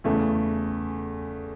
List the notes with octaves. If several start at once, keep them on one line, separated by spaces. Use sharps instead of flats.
E2 C#3 E3 A3